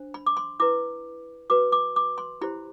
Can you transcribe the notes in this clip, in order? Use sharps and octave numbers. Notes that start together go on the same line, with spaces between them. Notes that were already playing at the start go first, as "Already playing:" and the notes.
Already playing: D4 C5
B5
D6
C6
E4 B4 D6
F#4 B4 D6
D6
D6
C6
E4 G4 C5 B5